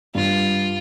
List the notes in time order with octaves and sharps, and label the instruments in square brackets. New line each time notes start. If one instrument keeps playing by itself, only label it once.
[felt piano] G2 [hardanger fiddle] F4